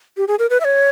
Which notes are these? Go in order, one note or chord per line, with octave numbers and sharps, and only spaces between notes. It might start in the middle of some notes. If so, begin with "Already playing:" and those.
G4
G#4
A#4
B4
E5
C#5